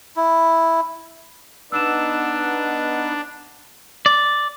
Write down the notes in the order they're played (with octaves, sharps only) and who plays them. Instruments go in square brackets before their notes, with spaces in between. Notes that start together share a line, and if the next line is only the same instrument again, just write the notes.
[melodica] E4
[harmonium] B3 D#4 B4 [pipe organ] D4 [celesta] E6 E7
[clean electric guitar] D5